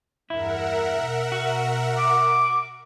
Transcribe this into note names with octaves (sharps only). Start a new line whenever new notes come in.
E2 G2 E4 A#4 E5 F#5
B2
F#4
D6